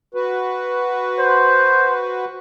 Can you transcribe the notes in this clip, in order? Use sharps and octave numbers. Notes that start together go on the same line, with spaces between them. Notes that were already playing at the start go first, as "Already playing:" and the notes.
F#4 B4
C5